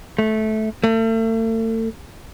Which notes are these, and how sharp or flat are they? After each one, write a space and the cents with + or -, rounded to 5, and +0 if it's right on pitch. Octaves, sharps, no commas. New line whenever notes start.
A3 -15
A3 +40